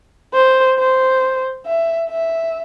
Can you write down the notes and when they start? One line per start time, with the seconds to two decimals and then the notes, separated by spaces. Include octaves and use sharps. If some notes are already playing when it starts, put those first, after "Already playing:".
0.34 C5
0.78 C5
1.66 E5
2.10 E5